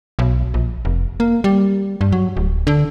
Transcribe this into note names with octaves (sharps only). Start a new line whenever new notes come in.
B1
A#1
F1
A#3
G3
G2
F#3
D1
D3